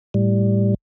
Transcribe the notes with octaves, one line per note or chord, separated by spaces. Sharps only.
A2 G3